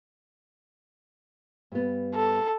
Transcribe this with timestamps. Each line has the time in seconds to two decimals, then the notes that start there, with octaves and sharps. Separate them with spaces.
1.72 G2 B3
2.15 A4